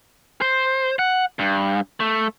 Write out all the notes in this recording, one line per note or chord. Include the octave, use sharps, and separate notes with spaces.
C5
F#5
G2
A3